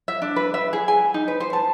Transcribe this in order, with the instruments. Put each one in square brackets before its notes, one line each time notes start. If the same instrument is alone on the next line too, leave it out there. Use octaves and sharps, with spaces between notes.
[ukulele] E5
D4
B4
E5
G#4
G#5
D#4
B4
C5
A5